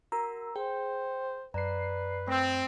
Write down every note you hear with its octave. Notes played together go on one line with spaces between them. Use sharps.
F#4 A#4 A#5 E6
G#4 C5 G5
F#2 B4 D5 A#5 C7
A3 C4